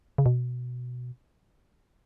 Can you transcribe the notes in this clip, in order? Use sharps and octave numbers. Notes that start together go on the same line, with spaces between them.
C#3
B2